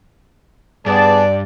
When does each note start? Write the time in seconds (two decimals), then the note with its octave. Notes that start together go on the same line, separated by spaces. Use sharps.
0.86 G2 B3 G#4 D5 A5